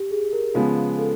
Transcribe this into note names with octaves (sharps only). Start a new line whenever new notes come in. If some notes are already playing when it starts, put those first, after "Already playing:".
Already playing: G4
G#4
A#4
C#3 F3 G#3 B3
A4